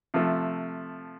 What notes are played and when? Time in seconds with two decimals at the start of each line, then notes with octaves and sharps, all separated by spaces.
0.14 C3 F3 A3